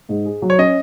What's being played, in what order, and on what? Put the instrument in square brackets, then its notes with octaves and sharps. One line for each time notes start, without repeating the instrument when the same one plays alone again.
[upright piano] G#2
G#4
F#3
[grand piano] C#5
[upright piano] C#4 [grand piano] D#5